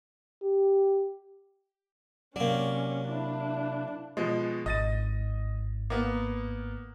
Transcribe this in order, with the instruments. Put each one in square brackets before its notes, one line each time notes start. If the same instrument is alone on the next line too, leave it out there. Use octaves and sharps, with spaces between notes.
[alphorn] G4
[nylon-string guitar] C3 D5 [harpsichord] F#3 A#3 [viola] C#4
[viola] D4 [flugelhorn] E4
[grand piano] B2 F3 G#3
[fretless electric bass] G#1 [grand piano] D#5 A6 D#7
[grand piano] A#3 B3